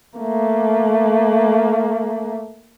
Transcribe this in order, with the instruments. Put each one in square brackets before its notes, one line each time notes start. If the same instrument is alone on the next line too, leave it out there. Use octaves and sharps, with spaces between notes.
[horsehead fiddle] A3 A#3